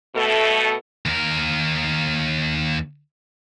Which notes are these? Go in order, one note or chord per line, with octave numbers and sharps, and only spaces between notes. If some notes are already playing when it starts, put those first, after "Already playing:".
B2 A3 A4
D#2 A#4